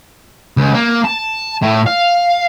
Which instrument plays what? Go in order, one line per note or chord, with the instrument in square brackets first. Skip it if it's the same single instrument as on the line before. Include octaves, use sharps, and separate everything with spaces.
[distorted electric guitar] C#2
A#3
A5
A2
F5